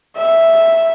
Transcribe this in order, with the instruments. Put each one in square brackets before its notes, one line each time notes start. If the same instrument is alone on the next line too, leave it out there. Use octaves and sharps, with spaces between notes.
[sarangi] E5